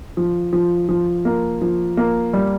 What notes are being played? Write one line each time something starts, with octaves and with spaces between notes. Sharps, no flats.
F3
F3
F3
A#3
F3
A#3
G3